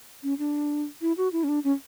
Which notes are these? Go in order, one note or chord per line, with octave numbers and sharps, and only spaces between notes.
C#4
D4
E4
F#4
E4
C#4
D4
C#4